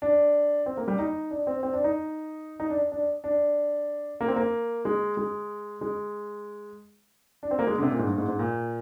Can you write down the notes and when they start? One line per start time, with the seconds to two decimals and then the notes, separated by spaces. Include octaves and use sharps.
0.02 D4
0.66 C4
0.77 A#3
0.88 G3
0.99 D#4
1.31 D4
1.47 C4
1.63 C4
1.73 D4
1.84 D#4
2.60 D#4
2.70 D4
2.92 D4
3.24 D4
4.21 A#3
4.28 C4
4.36 A#3
4.85 G#3
5.17 G#3
5.81 G#3
7.43 D4
7.51 C4
7.59 A#3
7.67 G#3
7.78 D3
7.83 C3
7.91 A#2
7.99 G#2
8.07 G2
8.18 G#2
8.28 G#2
8.39 A#2